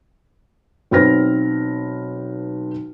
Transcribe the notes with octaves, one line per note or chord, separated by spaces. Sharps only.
B1 C4 B4 F6 A#6